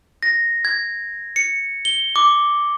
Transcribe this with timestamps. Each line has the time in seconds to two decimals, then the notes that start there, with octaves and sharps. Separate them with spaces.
0.23 A#6
0.65 G#6
1.36 C#7
1.85 G7
2.16 D6